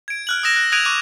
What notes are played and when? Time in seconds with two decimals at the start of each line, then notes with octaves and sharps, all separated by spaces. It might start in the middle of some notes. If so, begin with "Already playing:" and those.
0.08 G#6 D7
0.27 F6 F#6 F#7
0.43 D#6 E6 A#6 E7
0.56 F#6
0.72 D#6 F#6 G#6 D7 D#7 F7
0.85 C#6 D6 F#6 D#7